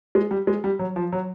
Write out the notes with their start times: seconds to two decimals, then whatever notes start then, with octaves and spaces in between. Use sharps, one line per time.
0.15 G#3
0.31 G3
0.47 G#3
0.64 G3
0.79 F#3
0.96 F3
1.13 F#3